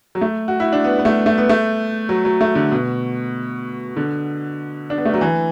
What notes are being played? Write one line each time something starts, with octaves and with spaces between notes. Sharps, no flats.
F#3
A3
F#4
E4
D4
B3
B3
A3
A3
B3
A3
F#3
F#3
A3
D3
B2
D3
D4
B3
A3
F#3
E3